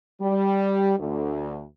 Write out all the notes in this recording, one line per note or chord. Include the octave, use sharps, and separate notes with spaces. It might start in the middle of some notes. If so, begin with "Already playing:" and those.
G3
D2